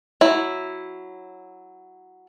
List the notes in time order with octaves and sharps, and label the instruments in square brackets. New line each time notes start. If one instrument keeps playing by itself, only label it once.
[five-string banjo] F#3 E4